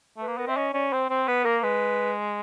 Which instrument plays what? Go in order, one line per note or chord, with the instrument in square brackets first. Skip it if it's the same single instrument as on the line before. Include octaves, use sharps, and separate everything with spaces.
[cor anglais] A3 [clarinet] B4
[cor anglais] A#3
[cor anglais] B3 [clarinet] A#4
[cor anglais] C4 [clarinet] E5
[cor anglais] C#4 [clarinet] D#5
[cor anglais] C#4 [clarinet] D5
[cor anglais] C4 [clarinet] C5
[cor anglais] C4 [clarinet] C5
[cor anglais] B3 [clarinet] B4
[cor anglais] A#3 [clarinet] A#4
[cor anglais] G#3 [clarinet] B4